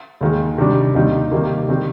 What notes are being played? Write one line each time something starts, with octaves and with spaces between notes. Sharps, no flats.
D#2 D#3 G#3
C3 D#3 G3 D4
D#2 D#3 G3 C4 D#4
C3 D#3 G3 A#3
D#3 G3 C4